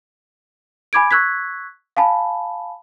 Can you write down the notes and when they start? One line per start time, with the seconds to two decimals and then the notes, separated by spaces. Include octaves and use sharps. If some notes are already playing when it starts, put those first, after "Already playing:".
0.93 G#5 B5 D6 G#6 D7
1.11 C#6 E6 F#6 G#6 B6
1.97 F5 G#5 A5 B5